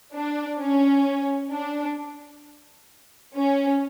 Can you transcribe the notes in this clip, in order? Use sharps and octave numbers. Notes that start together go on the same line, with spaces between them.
D4
C#4
D4
C#4